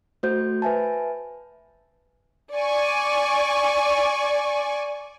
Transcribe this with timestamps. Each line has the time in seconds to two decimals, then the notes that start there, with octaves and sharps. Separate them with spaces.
0.23 A3 F#4 C5 G6
0.62 B4 E5 G#5 A5
2.55 D5 G#5 C#6